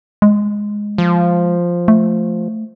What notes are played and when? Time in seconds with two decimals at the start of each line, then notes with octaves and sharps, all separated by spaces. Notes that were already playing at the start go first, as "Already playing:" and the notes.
0.22 G#3
0.98 F3
1.88 A3